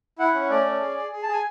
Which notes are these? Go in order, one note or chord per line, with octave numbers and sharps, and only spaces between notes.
E4 F#5
C#4
A3 D5
C#4
G#4
G#4
G#4
A5
G#4 G#5